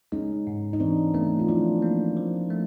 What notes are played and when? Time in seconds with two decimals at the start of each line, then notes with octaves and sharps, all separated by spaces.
0.12 G#3 C#4 D#4
0.47 G#2
0.73 D#4
0.80 E3 C4 D4
1.14 A3 B3 C#4
1.39 F4
1.48 F3 D4 E4
1.82 A#3
2.17 F3
2.50 A3